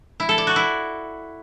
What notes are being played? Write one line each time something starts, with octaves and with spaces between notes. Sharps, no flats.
E4
A4
D5
F#4
E4